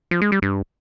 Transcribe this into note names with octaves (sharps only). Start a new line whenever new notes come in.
F3
G#3
G3
G2